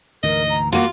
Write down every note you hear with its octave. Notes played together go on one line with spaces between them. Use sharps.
D2 G#2 E3 A#4 D#5
A#5
A#3 F4 F#4 F#5